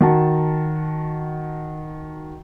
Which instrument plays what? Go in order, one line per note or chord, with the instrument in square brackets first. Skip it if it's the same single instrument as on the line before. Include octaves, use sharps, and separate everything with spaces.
[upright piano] D#3 F#4 A5